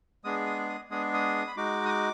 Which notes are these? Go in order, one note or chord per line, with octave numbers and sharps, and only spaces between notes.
G#3 B3 D4 G#4 D#6
D#6
D#6
G#3 B3 D4 G#4 D#6
D#6
B5
G#3 D#4 F#4 D6
D#6
D6